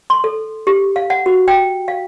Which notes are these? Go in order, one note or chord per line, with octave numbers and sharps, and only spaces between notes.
C6
A4
G4
F5
F#5
F#4
G5
F5